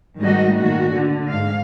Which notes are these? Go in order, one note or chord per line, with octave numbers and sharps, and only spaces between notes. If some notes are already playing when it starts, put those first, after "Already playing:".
G#2 D#3 G3 A3 F#4 D#5
A#2 D#3 A3 F#4
D3
G#2 G#3 F5